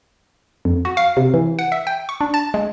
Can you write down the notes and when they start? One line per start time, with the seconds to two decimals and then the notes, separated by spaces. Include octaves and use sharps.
0.65 F2
0.85 F#4
0.97 F5
1.17 C3
1.34 E3
1.59 F#5
1.72 E5
1.87 G5
2.09 C#6
2.21 D4
2.34 A5
2.54 G#3